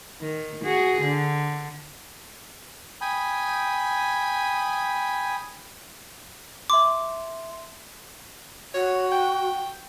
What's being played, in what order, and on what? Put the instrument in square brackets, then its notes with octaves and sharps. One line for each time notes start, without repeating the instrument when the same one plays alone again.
[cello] D#3
F#4 G#4
D3
[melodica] G5 G#5 B5 D#6
[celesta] E5 C6 [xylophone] D6
[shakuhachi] F#4 [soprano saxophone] C#5
[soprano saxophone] G5